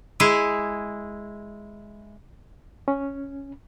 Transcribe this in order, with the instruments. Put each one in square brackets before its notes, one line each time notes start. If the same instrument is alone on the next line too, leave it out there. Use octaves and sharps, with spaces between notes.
[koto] G#3 E4 G#4
[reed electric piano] C#4